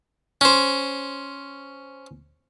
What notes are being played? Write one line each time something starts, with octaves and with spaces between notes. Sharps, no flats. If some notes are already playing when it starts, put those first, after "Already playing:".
C#4 C5